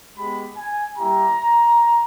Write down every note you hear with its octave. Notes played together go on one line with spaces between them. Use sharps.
G#3 B3 G4 B5
G#5
G3 A#3 E4 G4 A#5